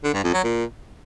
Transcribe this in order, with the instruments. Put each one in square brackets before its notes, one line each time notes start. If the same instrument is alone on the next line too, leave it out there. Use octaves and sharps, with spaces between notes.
[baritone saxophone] D3
G2
F2
F#3
A#2